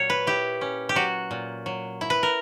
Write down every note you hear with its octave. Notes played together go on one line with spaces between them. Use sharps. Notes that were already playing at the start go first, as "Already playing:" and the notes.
Already playing: A#2 F#3 C#5
B4
E4 G4
C#4
G4
F#3 F#4
A#2
F#3
E4
B4
A#4